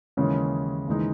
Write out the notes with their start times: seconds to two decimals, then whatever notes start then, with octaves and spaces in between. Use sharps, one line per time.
0.17 D#2 C#3 E3 G#3 C#4
0.87 D#2 C#3 E3 G#3 D#4